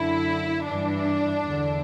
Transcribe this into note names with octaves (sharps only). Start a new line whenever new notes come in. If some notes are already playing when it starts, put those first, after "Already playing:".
Already playing: F#2 D3 E4
G2 E3 D4
E2 D3